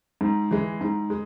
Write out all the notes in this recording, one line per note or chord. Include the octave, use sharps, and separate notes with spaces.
G#2
E3 G#3
G#2
G#3